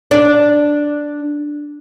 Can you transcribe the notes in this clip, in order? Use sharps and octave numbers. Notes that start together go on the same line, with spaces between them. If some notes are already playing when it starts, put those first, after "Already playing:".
D4 D5